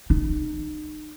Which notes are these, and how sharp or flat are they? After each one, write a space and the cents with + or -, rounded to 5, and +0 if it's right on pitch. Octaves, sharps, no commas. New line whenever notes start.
D#4 -30